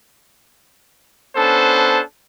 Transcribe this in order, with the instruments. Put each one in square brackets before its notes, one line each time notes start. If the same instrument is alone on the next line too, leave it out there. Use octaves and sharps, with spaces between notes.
[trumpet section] B3 C#4 D4 A4 C5 A5